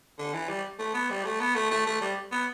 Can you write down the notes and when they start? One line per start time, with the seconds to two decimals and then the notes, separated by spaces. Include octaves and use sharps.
0.18 D3
0.34 E3
0.49 G3
0.79 A3
0.94 B3
1.10 G3
1.25 A3
1.40 B3
1.55 A3
1.71 A3
1.86 A3
2.01 G3
2.32 B3